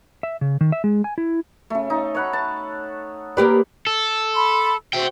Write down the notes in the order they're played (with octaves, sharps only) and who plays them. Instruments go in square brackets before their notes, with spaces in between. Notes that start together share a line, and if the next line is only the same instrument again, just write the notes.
[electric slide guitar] E5
C#3
D#3
E5
G#3
G#5
E4
[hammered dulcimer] C#3 A3
D#4
C#5 F#5 B5
A5
[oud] A#3 G4 D5 [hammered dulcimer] B4
[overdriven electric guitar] A4
[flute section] B5 C6
[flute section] F#4 C5 [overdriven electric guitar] E5 G5